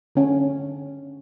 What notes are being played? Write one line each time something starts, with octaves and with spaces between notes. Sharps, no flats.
D3 C#4